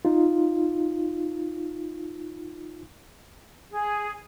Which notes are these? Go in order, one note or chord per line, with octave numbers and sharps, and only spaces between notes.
D#4 F4
G#4